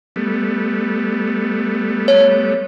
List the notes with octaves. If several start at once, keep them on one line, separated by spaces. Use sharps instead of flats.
G3 A3 B3
C#5